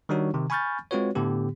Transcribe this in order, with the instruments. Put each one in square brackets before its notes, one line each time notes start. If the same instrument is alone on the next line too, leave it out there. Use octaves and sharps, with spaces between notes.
[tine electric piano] D#3 G3 D4 D#4 F#4 C#5
C3 D#3
G#5 B5 C#6 F6 G6 A6
G#3 C4 F4 F#4 B4 C#5
A2 D3 B3 G4